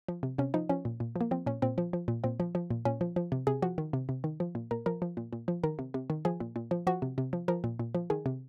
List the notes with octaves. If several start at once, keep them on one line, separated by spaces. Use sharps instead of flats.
F3
C3
C3 C#4
F3 D#4
F3 C#4
A#2
A#2
F3 A#3
F3 C4
A#2 C#4
A#2 C4
F3
F3
A#2
A#2 C4
F3
F3
A#2
A#2 C#4
F3
F3
C3
C3 G#4
F3 F#4
D#3
C3
C3
D#3
F3
A#2
A#2 A#4
F3 A#4
F3
A#2
A#2
F3
D#3 A#4
C3
C3
D#3
F3 G#4
A#2
A#2
F3
F3 F#4
C3
C3
F3
F3 A#4
A#2
A#2
F3
D#3 G#4
C3